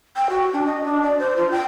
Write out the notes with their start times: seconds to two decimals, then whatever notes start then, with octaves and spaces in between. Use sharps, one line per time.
0.16 G5
0.30 F#4
0.53 D4
0.66 D#5
0.84 D4
1.03 D5
1.19 C5
1.37 F4
1.51 G5